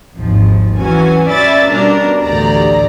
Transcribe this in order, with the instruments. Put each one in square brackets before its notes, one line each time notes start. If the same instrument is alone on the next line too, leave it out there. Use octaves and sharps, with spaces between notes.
[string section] G#1 D#2 F3
E3 F#3 C#4 F#4 G#5
C#4 D5 E5 G#5 B5 A6
B2 G3 C#4 D4 A#4
A1 D2 G4 D5 A#5